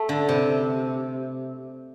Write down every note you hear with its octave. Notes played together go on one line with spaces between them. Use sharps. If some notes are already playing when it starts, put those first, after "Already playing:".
Already playing: A3
D3
C3